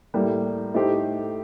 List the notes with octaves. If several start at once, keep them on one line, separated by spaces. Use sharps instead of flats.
A2 G3 A#3
A2 A3 D#4 G4 C5